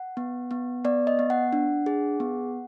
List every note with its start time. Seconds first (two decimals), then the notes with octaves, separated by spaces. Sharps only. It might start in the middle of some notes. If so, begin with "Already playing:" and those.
Already playing: F#5
0.17 B3
0.51 B3
0.85 B3 D5
1.07 D#5
1.19 B3
1.30 F#5
1.53 D4
1.86 G#4
2.20 B3